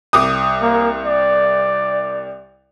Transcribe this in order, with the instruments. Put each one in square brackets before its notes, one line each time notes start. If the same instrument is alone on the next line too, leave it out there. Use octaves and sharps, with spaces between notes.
[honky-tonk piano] C2 D6 D#6
[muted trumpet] A#3
D5